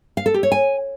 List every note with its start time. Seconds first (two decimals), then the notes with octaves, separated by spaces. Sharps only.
0.17 F5
0.26 A4
0.34 G4
0.43 C#5
0.52 G#5